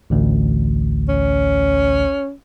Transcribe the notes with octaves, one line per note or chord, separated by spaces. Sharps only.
A1 D2
C#4